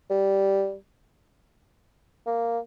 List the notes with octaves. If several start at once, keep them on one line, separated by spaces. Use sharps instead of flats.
G3
A#3